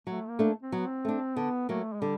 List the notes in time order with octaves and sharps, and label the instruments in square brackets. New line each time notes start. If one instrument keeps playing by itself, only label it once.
[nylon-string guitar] F#3 [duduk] A3
[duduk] A#3
[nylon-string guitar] A3 D4
[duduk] C4
[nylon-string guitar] F#3 [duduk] B3
[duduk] C4
[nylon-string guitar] A3 D4
[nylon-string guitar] D3 [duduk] B3
[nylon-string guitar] F#3 A#3 [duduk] A3
[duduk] G#3
[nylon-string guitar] D3 [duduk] G3